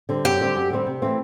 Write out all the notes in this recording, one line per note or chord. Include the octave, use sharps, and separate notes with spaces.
D3 G3 C4
F#2 G4
D3 G3 C4
F#2
D3 G3 C4
C3
E3 A3 C4